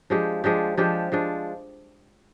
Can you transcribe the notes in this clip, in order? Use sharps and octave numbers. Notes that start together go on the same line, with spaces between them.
F3 G#3 D4 G4
F3 G#3 D4 G4
F3 G#3 D4 G4
F3 G#3 D4